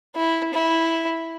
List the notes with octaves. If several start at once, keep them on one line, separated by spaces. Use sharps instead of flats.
E4
E4